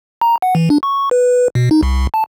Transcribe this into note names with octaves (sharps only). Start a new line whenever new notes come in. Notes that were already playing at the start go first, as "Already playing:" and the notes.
A#5
F#5
E3
D4
C#6
B4
B2
D#4
C2
A5